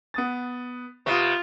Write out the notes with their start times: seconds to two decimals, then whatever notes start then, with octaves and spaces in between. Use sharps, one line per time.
0.14 B3 D#6 A6
1.06 C3 B3 F4 C#6 D#6